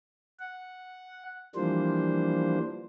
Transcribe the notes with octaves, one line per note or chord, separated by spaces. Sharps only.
F#5
E3 F3 G3 A#3 D4 C5